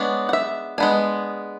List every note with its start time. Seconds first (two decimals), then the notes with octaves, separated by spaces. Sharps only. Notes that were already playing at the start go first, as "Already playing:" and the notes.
Already playing: G#3 B3 D4 C#5
0.29 F#5
0.33 E5
0.78 G#3 B3 D4 G#5